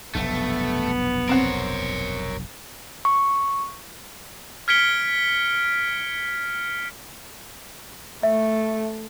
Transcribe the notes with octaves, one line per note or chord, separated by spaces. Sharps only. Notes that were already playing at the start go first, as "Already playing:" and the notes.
F1 B1 G2 A3 B3
C4 A#4 C#5 F#5
C#6
F6 G#6 B6 C#7 D7 G7
A3 E5